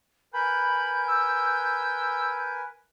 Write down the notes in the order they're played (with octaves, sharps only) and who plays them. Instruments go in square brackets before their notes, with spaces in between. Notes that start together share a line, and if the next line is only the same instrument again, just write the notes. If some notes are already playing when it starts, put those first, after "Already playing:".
[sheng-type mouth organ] A#4 B4 G#5 [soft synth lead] B5 [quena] G6
[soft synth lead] E6